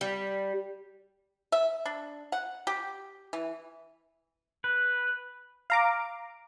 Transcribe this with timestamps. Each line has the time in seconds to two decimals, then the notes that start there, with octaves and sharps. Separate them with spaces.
0.01 G3
1.52 E5
1.85 D4
2.32 F#5
2.67 G4
3.33 E3
4.64 B4
5.70 F5 A#5 D6